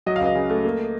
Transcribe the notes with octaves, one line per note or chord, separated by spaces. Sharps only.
F#3 D#5
F5
C#2
D#5
C#3
A3
A#3